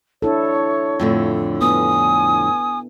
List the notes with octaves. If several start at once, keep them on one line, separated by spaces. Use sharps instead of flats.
D4 E4 A4 C#5
F2 A2 D3
B3 G#5 D#6